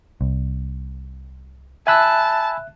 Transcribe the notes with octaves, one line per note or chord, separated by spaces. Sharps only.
C2
E5 G#5 A5 B5 E6 F#6